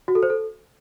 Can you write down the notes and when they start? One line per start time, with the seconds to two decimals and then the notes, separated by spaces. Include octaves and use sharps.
0.08 F#4
0.15 A4
0.23 C5
0.30 A4